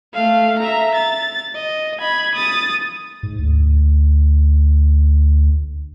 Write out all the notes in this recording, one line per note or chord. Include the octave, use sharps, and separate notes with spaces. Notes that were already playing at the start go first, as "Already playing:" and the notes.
A3 F5
E5 A#5
A6
D#5
B5 G#6
D#6 A6
G#2
D2